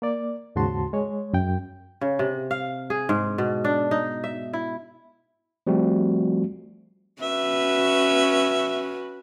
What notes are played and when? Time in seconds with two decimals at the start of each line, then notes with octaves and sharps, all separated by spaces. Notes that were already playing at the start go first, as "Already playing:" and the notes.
0.02 A#3 D5
0.56 D#2 G#2 C#3 F#4 A5 C6
0.93 G#3 C#5
1.33 F#2 G5
2.01 C#3
2.19 C3
2.51 F5
2.90 G#4
3.09 G#2
3.38 B2
3.64 D4
3.91 D#4
4.24 E5
4.53 E4
5.67 F3 G3 A3 C4 F#4
7.22 C#4 F#4 B4 E5